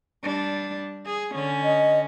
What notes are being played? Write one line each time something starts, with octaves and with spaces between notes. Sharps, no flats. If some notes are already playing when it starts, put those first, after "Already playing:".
G3 D4
G#4
D3 C#4
D#5